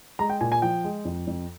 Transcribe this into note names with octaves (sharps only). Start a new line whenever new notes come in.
G#3 A#5
G5
A#2 G#5
G#5
F3 G5
G#3
F2
F2